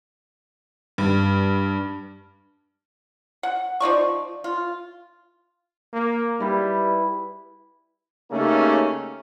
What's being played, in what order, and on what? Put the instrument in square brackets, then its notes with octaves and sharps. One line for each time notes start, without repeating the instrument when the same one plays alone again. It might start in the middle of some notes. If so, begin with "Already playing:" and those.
[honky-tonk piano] G2
[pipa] F#5
F3 D#4 D5 C#6
F4
[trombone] A#3
[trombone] G3 [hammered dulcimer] E4 B4
[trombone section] C#3 A3 A#3 C#4 D#4 G4